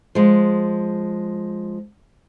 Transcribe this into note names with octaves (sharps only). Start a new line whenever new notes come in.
F3 G#3